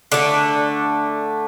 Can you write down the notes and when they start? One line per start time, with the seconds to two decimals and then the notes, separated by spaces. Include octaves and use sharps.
0.12 D3 A3 D5